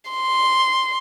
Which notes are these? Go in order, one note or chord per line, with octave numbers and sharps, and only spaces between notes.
C6